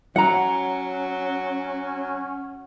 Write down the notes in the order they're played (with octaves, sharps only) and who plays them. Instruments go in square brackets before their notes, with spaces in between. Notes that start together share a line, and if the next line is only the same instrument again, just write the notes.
[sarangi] F#3 [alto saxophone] C#4 [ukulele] F#5 A#5